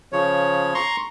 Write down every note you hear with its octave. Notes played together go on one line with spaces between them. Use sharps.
C#3 F3 C#5
A#5 C6 C#6